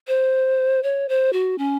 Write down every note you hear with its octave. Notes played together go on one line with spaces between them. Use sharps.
C5
C#5
C5
F#4
C#4